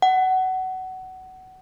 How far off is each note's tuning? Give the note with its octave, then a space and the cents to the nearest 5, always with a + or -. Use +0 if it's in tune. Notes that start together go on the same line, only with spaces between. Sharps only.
F#5 +20